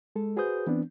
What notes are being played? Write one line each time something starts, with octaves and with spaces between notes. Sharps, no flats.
G#3 A4
F#4 G#4 B4 C5 D#6 G6
E3 B3 C4 D4